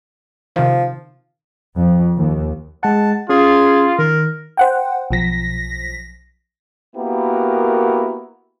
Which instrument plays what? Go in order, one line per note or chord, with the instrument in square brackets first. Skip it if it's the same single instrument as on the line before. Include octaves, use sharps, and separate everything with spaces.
[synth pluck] C3 D#3 [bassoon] F3
[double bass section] F2
D#2
[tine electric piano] G#3 F#5 [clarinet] A5
[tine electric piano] C#4 [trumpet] F4 [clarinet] G#4
[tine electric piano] D#3 [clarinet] A#4
[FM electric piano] C5 F#5 G5
B1 F3 A#6 B6
[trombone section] A#3 B3 E4 F#4 G4 A#4